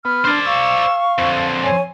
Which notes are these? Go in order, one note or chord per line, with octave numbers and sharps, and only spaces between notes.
B3 F6
D4 C5 D5
F5 C#6 E6
F2 D3 C4
C#5 G#5